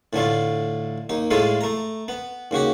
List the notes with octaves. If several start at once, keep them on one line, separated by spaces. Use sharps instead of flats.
A2 D3 A3 F4
D#2 D#4
A2 G#3 A3 F4 G#4 A4
A3 A#5
B3
D#2 C#3 F#4 G4